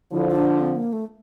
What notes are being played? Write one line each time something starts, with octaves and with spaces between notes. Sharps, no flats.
D3 F3 E4
E4
D4
C4
A#3
A3